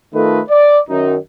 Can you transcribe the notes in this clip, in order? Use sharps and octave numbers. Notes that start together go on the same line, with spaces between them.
D#3 A3 F4 A4 B4 D#5
D5
F#2 D#3 D#4